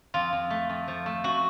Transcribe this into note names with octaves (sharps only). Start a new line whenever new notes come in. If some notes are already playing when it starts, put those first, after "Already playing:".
F2 F4
F2
A3
F2
F3
A3
F2 F#4